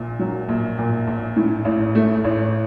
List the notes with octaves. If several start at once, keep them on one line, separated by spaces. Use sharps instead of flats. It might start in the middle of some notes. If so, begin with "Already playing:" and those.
Already playing: A#1 A#2
F#3
A#1
A#2
A#1
A2
A1
A3
A1